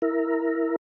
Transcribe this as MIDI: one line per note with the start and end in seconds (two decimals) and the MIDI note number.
0.02 0.76 64
0.02 0.76 70